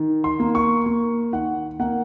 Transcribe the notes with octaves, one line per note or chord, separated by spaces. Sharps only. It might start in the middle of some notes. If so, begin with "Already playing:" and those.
Already playing: D#3
C6
A#3
C#6
A#3
D#3 F#5
A#3 F#5